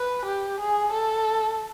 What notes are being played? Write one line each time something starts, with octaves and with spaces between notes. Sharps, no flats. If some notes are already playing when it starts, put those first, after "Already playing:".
Already playing: B4
G4
G#4
A4